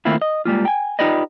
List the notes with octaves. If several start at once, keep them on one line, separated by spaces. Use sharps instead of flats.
D#3 A3 A#3 C4 E4 F4
D#5
G3 G#3 A#3 F4
G5 G#5
D#4 F4 G4 B4 D5 D#5